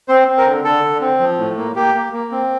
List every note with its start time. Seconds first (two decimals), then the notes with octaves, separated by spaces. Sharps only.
0.08 C4 C5
0.28 C4
0.37 A#4
0.46 D3
0.64 D3 A4
0.84 D3
1.01 C4
1.20 F3
1.38 A2
1.57 A#3
1.76 A#3 G4
1.94 A#3
2.13 A#3
2.31 C4